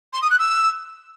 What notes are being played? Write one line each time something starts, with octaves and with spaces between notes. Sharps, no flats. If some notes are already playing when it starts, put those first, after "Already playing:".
C6
D#6
F#6
E6